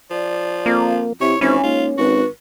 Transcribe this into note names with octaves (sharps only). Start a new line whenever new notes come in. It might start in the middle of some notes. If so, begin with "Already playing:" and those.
F3 D5
F2 A#3
C3 E4 C#5
G#1 E3 C#4 C5
G#2 A#3 F4
G#1 F#4 B4